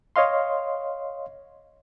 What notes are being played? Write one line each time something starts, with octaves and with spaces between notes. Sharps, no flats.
C#5 D#5 F5 C6